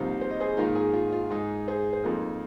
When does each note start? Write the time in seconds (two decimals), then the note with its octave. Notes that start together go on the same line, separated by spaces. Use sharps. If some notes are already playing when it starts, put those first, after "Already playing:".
Already playing: C2 C3 F3 A#3 D#4 C5 F5
0.21 C5
0.31 D#5
0.40 G#4 C5
0.57 G#2 D#3 A#3 D#4 F4 A#4
0.75 D#4 G#4
0.94 F4
1.12 F4
1.30 G#2 G#3 D#4 G#4
1.68 G#4 C5
1.93 C5
2.04 F2 F3 A#3 D#4 F4 A#4